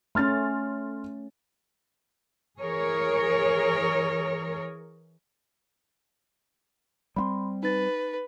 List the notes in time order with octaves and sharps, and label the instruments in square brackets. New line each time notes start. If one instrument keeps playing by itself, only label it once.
[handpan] A3 C#4 [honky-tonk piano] C6 F6 A6
[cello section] E3 G#4 A#4 C#5
[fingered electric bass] G3 B3 C4 [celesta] B5 C6
[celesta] D#4 A6 [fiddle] B4